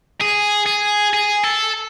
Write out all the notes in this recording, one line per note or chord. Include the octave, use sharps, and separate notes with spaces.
G#4
G#4
G#4
A4